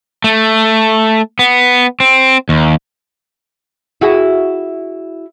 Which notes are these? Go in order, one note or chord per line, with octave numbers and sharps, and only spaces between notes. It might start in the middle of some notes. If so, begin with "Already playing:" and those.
A3
B3
C4
D#2
E4 F#4 G#4